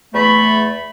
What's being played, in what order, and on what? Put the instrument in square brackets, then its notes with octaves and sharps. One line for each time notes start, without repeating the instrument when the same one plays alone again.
[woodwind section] E2 A3 B5